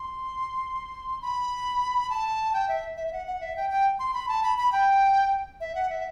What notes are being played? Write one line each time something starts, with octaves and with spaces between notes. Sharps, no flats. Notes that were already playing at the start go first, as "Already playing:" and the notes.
Already playing: C6
B5
A5
G5
E5
E5
E5
F#5
F#5
E5
G5
G5
C6
B5
A5
B5
B5
G5
E5
F#5
E5